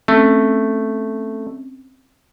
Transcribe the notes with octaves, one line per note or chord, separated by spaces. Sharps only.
A3 C4 C#4